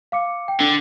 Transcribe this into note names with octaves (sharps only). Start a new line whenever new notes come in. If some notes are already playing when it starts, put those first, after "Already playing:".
F5 D6 C#7
G5
D3